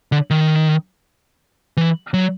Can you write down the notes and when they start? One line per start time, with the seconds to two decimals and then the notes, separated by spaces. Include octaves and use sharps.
0.12 D3
0.31 D#3
1.77 E3
2.14 F#3